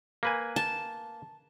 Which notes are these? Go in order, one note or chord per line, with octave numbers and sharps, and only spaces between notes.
A#3 B4 G#5
A5